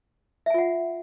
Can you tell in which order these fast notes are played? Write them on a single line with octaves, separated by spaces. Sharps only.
E5 G#5 F4 F#5